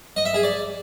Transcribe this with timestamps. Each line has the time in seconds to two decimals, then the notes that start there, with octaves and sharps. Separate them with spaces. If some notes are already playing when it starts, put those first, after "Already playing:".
0.16 D#5
0.25 E5
0.34 G#4
0.43 D5